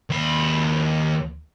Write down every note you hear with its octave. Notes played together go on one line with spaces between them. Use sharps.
D#2 B5